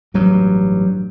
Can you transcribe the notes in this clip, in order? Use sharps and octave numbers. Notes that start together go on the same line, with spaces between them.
A1 G2 F#3